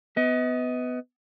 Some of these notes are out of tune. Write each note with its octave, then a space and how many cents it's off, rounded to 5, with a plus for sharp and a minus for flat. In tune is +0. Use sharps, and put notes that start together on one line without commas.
B3 +20 D#5 +35